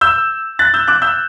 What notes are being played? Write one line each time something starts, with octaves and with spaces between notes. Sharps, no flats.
E6 G6
F#6 A6
E6 G6
D6 F#6
E6 G6